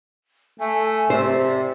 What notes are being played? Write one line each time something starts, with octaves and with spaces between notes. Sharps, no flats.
A3 G#5
C3 C5 D5